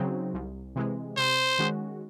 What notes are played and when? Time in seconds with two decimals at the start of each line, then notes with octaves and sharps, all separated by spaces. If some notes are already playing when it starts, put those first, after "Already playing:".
Already playing: C#3 F#3 C4 D#4
0.34 C2
0.76 C3 E3 G#3
1.17 C3 C5
1.59 D#3 G#3 C#4 F#4